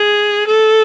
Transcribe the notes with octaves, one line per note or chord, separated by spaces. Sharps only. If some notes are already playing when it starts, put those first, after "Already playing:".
Already playing: G#4
A4